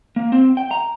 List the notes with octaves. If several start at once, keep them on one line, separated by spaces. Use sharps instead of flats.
A#3
C4
G5
A#5